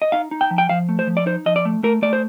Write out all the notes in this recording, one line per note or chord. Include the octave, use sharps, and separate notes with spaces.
D#5
D#4 F5
D#4
G5
F3
G5
F3 F5
A3
C5
F3
D5
D#4 C5
F3 D#5
D5
A3
A3 A#4
A3 D5
C5